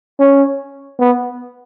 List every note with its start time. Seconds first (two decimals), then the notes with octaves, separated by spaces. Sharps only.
0.19 C#4
0.99 B3